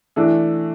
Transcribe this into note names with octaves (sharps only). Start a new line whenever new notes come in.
E3 A3 D4